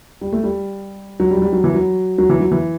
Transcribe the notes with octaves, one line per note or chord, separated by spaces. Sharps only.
G3
A3
G3
F#3
G3
F#3
G3
F#3
E3
F#3
F#3
E3
F#3
E3